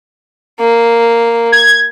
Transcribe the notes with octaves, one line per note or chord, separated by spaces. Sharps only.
A#3
G#6